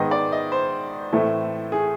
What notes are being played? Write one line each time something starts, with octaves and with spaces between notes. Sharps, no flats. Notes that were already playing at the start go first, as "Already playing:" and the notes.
Already playing: G#2 D#3 G#3 B3 D#5
D5
D#5
C5
A2 E3 A3 C4
G#4